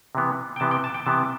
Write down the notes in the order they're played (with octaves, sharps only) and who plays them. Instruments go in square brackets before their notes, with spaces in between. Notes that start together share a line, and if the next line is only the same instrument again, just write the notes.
[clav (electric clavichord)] C3 E3 B3
G5
C3 E3 B3 A5
G5
A5
G5
C3 E3 B3 A5